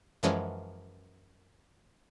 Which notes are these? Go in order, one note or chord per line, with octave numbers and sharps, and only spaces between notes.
F#2 E3 F3 G#3 C#4